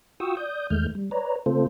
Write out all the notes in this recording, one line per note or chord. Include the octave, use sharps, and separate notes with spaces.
F4 F#4 G5 C#6 D#6 E6
D5 D#6 G6
E2 D#3 G#3 A3 F6 G6
G3
B4 C#5 D5 A#5
C#3 A3 C4 F4 A4 C5